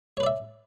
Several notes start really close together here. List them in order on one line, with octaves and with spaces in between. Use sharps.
C#5 B4 D5 E5